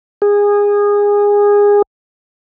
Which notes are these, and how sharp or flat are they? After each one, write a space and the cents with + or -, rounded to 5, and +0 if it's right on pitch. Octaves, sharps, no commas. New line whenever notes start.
G#4 -20